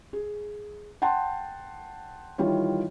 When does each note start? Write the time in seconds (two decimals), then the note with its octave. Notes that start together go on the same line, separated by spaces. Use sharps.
0.13 G#4
1.02 F#5 G5 A5 C6
2.38 D#3 E3 G3 F4 C#5